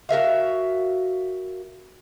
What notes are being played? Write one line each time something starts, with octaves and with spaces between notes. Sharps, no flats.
F#4 A#4 E5 F5